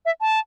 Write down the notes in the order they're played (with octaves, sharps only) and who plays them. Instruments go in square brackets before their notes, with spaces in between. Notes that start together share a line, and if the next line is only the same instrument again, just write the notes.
[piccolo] E5
A5